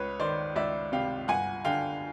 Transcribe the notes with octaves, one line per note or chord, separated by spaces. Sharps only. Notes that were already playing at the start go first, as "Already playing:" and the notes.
Already playing: C#2 B4 C#5
D#3 C5 D5
C#2 D5 E5
C3 F5 G5
G1 F#5 G#5
D3 F5 G5